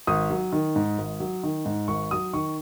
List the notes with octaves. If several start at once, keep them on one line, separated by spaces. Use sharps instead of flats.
G#1 D#6
F#3
D#3
G#2
G#1
F#3
D#3
G#2
G#1 C#6
F#3 D#6
D#3 C#6